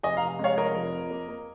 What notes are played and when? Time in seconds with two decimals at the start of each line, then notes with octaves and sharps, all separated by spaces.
0.03 F1 D#5 G#5
0.17 F1 F5 A#5
0.39 G#3 C#5 F5
0.57 F1 A#4 D#5
0.75 F2
0.93 F2
1.11 A#3
1.28 A#3